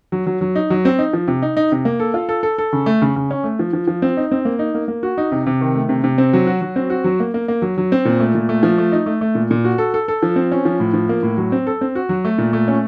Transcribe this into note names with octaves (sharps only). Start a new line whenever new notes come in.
F#3
F#3
F#3
D#4
F#3
C4
D#4
F3
C3
D#4
D#4
C3
A#3
A4
F4
A4
A4
A4
C#3
A3
C#3
C#3
C#4
A3
F3
F3
F3
C4
D#4
C4
A#3
D#4
A#3
A#3
F#4
D#4
C3
C3
D#3
A3
C3
C3
C4
F#3
F#4
F#3
C4
F#4
F#3
A#3
A#3
A#3
F#3
F#3
C4
A#2
A3
A#2
A3
F3
A3
D#4
A3
A3
A#2
A#2
F#4
A4
A4
A4
F3
C4
C#4
F3
A2
F3
A#3
A2
F#3
C4
A4
C4
F#4
F#3
A3
A#2
A3
C#4